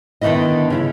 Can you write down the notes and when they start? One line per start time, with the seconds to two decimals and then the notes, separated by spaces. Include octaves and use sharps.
0.21 D3 D#3 A3 B3 E4 D#5
0.70 C#3 E4